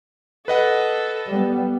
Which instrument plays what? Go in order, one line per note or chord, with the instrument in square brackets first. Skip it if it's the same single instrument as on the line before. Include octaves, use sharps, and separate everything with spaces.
[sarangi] A4 [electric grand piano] B4 D#5 F#5
[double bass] G3 B3